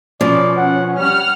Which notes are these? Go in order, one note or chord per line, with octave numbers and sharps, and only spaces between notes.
B2 F3 C#4 D5
F#5
G3 F#5 F6